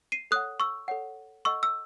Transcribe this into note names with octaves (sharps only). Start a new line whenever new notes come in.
C7 D#7
A4 C#5 F#5 D#6 F#6
C#6 E6
A4 C#5 F#5
A4 D#5 F#5 C#6 E6
E6